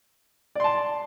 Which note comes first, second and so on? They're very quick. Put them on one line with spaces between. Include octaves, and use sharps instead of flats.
D5 C6 A5